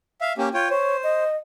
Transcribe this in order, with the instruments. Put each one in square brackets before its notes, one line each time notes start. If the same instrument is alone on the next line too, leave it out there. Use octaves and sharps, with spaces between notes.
[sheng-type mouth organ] E5 F5
A#3 C#4 G4
F4 C#5 G5
[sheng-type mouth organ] C5 [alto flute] C#5
[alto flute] D#5